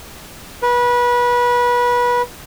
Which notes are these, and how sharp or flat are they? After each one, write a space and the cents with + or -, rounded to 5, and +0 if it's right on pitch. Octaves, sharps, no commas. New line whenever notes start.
B4 -25